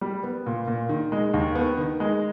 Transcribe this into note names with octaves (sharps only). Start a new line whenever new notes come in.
G3
B3
A#2
A#2
D#3
G#3
D#2
B3
D#3
G#3